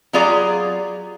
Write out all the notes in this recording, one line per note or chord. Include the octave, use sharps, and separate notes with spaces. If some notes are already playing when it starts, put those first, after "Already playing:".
F#3 F4 G4 G#4 D5 A#5